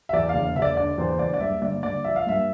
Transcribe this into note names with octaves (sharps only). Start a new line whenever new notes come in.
E5
E2 D5
F5
E1
E1 E5
D5
D3 D5
E2 C5
E1 D5
D5
G2 E5
G1 D5
G1 D5
F3 E5
F5
G2 E5